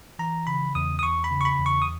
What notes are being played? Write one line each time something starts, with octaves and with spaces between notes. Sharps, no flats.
E3 A#5
C#3 B5
E2 D#6
D#6
E2 C#6
B5
C#3
C#6
B5
E2
C#6
D#6